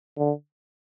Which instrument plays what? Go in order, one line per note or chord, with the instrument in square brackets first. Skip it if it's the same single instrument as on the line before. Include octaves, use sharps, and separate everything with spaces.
[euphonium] D3